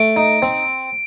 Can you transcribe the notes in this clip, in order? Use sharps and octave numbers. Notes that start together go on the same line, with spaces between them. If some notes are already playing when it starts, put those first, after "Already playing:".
Already playing: A3 D7
D#4
C4